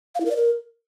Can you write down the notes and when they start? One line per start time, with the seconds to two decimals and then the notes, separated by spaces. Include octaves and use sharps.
0.15 F5
0.20 E4
0.25 A#4
0.31 D5
0.36 A#4